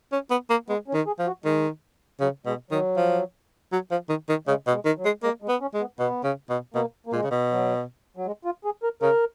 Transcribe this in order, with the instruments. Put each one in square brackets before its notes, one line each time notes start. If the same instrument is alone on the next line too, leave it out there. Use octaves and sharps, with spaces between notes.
[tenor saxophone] C#4
B3
A#3
[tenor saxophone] G#3 [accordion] B3
[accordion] C#4
[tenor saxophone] D#3
[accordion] G#4
[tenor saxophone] F3
[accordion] F#4
[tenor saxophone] D#3 [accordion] G#3
[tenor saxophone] C#3 [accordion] F#3
[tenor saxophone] B2 [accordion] G#3
[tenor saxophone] D#3 [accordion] F#3
[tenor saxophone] F3
F#3
F3
D#3
D#3
[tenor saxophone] C#3 [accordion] G#3
[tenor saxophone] B2
[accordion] G#3
[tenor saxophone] D#3
[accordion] F#3
[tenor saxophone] G#3
[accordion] G#3 [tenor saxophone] A#3
[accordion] G#3
[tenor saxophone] B3
[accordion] C#4
[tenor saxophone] G#3
[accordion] B3
[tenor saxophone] B2 [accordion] B3
[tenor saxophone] C#3
B2
[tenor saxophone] B2 [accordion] A#3
[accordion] A#3
[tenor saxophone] A#2 [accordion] G#3
[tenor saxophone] C#3
B2
[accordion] F#3
F#3
G#3
F4
G#4
A#4
[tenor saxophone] C#3 [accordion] A#4